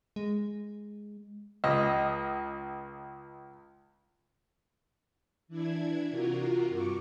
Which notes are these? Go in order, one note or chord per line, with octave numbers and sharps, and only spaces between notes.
G#3
C#2 D#5
E3 D4 E4 G#6
C3 F4 F#4 A#4
G2 C#6 D6